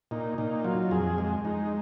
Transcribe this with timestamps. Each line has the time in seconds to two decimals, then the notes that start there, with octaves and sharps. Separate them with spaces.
0.11 A#2 D#4
0.38 A#2 D#4
0.64 F#3 F4
0.91 F2 G#4
1.18 G#3
1.45 G#3 D#4